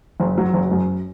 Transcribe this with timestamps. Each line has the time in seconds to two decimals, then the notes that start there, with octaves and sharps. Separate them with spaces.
0.20 F#1
0.38 F#3
0.54 F#1
0.71 F#2